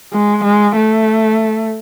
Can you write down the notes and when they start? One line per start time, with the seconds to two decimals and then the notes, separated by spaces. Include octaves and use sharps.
0.13 G#3
0.44 G#3
0.76 A3